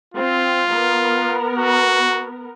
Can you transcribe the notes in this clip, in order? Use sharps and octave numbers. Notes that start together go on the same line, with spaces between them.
C4 F4
B3 A#4
F#4